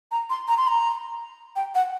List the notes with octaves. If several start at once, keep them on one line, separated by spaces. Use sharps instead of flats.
A#5
C6
A#5
C6
A#5
G5
F#5